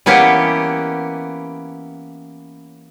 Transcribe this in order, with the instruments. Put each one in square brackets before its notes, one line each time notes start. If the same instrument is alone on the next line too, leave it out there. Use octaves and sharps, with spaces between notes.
[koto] E3 A#3 B3 C#4 G4